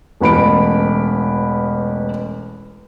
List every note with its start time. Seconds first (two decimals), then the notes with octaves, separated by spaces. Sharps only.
0.20 E1 A1 B5 D7